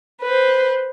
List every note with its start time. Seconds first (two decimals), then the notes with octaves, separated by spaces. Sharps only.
0.22 B4 C5